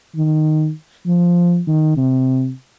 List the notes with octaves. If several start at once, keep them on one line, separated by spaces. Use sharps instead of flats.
D#3
F3
D#3
C3